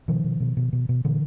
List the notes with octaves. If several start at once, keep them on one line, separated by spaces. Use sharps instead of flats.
B2 D#3 F3
B2
B2
B2
B2
B2
A#2 D3 E3